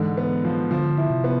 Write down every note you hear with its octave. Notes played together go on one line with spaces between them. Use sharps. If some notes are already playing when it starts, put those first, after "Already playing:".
Already playing: G#2 D3 E3
B3
F3
D3 F3
E4
C3
B3